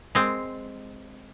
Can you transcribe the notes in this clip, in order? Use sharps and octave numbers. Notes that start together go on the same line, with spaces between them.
G#3 C4